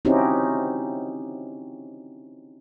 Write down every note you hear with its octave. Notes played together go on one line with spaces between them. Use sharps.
C4 C#4 D#4 E4 F#4 G4